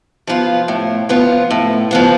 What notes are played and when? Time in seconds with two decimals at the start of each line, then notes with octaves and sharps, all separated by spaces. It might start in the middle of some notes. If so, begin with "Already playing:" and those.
0.27 F3 B3 F4
0.68 A2
1.09 F3 B3 F4
1.51 A2
1.91 F3 B3 F4